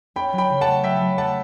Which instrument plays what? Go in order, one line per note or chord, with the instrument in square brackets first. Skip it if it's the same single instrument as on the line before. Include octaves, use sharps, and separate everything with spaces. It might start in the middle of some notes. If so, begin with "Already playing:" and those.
[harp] C#4 [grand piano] G5 B5
[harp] F#3
[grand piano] G5 B5
[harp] C#3
[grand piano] F#5 A5
[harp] A3
[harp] F#3 [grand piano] E5 G5
[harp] F#3
[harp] A3 [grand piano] F#5 A5